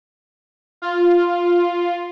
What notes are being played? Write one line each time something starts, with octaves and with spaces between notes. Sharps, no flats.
F4